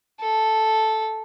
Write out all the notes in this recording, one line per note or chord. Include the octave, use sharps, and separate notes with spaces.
A4